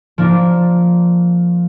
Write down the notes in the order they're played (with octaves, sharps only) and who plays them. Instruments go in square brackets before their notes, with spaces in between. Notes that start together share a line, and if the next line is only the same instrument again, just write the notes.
[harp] F3 A#3 D4